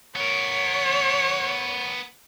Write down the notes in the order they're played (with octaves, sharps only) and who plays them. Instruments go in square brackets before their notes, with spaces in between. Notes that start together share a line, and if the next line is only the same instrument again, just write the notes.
[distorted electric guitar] B3 A#4 [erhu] C#5